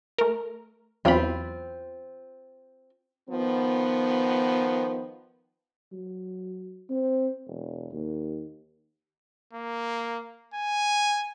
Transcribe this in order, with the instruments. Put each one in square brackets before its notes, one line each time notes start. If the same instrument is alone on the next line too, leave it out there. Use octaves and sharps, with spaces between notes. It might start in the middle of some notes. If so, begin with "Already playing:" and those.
[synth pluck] A3 A#4
[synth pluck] E2 F#3 B5 [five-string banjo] C4 F4
[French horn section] D#3 F3 B3
[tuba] F#3
C4
E1
D#2
[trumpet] A#3
G#5